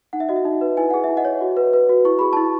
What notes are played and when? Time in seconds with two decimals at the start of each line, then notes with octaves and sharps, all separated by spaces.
0.13 D#4 F#5
0.20 E5
0.29 F#4 D#5
0.36 E5
0.45 D#4
0.61 B4
0.77 E4 G#5
0.90 G#4 F#5
1.04 E5
1.09 E4
1.17 D#5 F#5
1.25 C#5
1.41 F#4
1.57 B4
1.73 B4
1.89 F#4
2.05 E4 C#6
2.19 G#4 B5
2.33 E4 A5